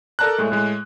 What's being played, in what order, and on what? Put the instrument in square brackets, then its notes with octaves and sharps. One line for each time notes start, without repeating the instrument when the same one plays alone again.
[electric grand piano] A4 A#4 D5 A5 A#5 F#6
A2 G#3 A3
A2 G#3